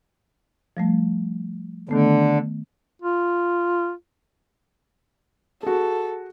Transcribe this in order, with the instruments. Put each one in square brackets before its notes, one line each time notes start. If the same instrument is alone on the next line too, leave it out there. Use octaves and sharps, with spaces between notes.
[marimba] F3 G3 A3
[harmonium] D3 [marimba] D#3 A3 B3
[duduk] F4
[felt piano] F#4 G#4 [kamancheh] A4